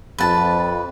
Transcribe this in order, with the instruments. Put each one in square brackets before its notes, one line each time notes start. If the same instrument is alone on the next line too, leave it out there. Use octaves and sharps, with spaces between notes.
[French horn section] F2 [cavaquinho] B4 A5